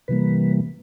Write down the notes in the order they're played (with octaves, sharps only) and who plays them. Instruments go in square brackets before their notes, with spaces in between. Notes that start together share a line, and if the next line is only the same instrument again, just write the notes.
[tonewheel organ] C3 E3 G3 A#3 B4